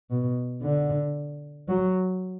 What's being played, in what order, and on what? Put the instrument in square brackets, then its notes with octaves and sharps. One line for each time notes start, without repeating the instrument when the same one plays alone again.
[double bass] B2
D3
F#3